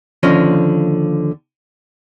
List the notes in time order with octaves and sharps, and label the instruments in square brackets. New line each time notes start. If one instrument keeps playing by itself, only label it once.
[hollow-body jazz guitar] D#2 D3 F3 C#4 D#5